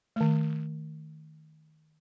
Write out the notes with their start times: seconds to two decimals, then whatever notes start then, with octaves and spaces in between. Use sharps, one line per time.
0.16 D#3 A3